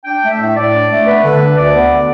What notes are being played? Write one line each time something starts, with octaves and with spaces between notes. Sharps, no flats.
D4 G5
A3
E5
A2
A2 D5
D4
A3
B3 B4
D3
D4
D2 D5
B3
D3